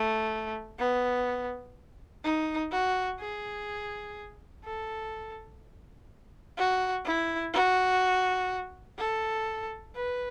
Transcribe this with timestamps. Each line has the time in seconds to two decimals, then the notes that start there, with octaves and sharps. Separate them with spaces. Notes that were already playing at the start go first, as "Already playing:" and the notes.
Already playing: A3
0.78 B3
2.24 D#4
2.72 F#4
3.20 G#4
4.64 A4
6.57 F#4
7.05 E4
7.53 F#4
8.98 A4
9.94 B4